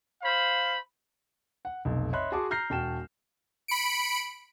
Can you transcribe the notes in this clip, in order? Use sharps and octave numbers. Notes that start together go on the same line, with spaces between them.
C5 F5 B5
F#5
F1 B1
C#5 D#5 E5 B5 C6 F#6
F#4 G#4 F#5 A5 C6 D6
A#5 F6 G6 A#6 C7
E1 F#4 G5 A5 F6 E7
B5 C#7 D7